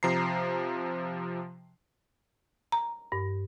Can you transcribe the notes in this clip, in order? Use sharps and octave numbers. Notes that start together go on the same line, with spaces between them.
C3 F3 A#5 C7
A#5
G2